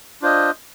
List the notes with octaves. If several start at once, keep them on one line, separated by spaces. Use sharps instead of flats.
D4 F4 C5 D#5